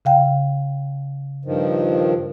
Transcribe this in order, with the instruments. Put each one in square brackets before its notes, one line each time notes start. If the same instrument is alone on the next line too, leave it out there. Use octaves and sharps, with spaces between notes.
[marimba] C#3 F5 G5
[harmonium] G2 D#3 F3